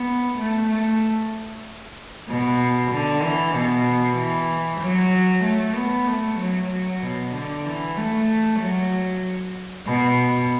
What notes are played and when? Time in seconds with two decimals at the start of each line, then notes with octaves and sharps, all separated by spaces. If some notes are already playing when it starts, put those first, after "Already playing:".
Already playing: B3
0.38 A3
0.70 A3
2.28 B2
2.92 D3
3.23 E3
3.54 B2
4.17 E3
4.82 F#3
5.44 A3
5.75 B3
6.07 A3
6.40 F#3
6.71 F#3
7.03 B2
7.34 D3
7.65 E3
7.97 A3
8.60 F#3
9.86 B2